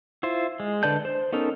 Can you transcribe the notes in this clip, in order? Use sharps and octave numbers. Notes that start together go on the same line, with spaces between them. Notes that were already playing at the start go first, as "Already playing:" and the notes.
E4 F4 C5
G#3
D3 B4 D5 A5 G6
C5
B3 C#4 D#4 A4 A#4